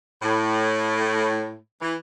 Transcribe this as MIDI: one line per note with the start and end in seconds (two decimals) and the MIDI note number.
0.22 1.54 45
1.82 1.95 52